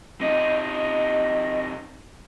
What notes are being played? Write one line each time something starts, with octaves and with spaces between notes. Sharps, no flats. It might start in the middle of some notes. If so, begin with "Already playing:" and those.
C3 D#4 D#5